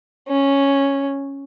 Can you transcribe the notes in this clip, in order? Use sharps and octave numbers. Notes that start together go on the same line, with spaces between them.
C#4